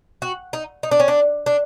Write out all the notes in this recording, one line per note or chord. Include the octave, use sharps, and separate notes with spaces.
F#4
D#4
D#4
D4
C#4
D4
D4